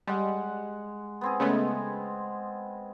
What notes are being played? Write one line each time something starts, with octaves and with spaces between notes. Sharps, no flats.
G3 G#3 F#5
B3 C4 G#4
C#3 G#3 A3 B3